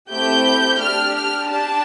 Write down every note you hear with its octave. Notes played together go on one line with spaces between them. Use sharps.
A3 C4 E4 G4 G6
D4 G4 F6
F6
D4 G4 A5